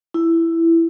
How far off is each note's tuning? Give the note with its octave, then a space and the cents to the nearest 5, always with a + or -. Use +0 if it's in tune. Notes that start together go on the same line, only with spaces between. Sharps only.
E4 +10